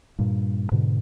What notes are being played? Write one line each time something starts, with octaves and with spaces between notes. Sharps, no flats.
G2 A#2
G#2 B2 D3